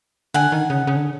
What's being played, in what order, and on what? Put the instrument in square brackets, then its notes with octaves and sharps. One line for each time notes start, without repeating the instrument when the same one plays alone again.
[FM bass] D3 [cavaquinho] F#5 G#5
[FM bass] D#3
C#3
C#3
D3